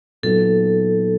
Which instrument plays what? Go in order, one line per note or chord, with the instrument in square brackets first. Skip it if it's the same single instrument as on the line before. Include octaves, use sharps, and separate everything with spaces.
[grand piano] A#2 F#3 B3 D#4 [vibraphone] A4